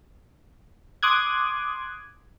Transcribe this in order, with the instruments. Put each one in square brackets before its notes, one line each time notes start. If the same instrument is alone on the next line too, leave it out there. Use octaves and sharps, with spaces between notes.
[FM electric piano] C6 D6 D#6 F#6 G#6